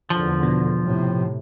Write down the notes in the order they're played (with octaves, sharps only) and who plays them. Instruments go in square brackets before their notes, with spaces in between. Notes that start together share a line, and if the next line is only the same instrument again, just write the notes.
[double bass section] E2 D3 [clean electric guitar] F3
[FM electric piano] B2
[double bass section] A2 C3